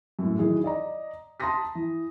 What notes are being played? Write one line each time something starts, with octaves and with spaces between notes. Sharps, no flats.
F#2 A2
D#3 E3 F#3 G#4
D5 D#5 A#5
A5 A#5 C6 D#6 A#6 B6
E3